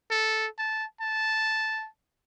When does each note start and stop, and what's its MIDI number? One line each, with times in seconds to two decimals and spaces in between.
0.10 0.46 69
0.59 0.85 81
1.01 1.87 81